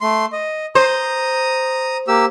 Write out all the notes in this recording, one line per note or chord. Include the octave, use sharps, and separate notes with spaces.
A3 C6
D#5
C5 A#5 D#6
A#3 G4 E6